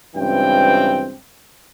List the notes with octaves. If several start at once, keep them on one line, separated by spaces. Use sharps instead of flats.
C#2 G2 C#3 E3 C4 G5